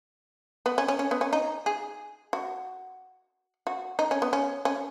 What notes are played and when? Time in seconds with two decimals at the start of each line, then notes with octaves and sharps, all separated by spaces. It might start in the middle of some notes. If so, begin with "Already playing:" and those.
0.66 B3
0.78 C#4
0.88 C#4
0.99 C#4
1.11 B3
1.21 C#4
1.33 D#4
1.66 G#4
2.33 F#4
3.67 F#4
3.99 D#4
4.11 C#4
4.22 B3
4.33 C#4
4.65 C#4